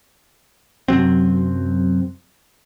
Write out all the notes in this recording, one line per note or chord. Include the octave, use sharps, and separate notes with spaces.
F#2 C3 F#3 C4